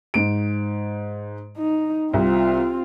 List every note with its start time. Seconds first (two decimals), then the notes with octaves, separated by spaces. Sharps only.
0.14 G#2 D7
1.58 D#4
2.13 C2 C4 F4